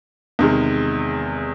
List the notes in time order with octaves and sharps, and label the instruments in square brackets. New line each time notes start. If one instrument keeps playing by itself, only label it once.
[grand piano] E2 C3 D#3 G#3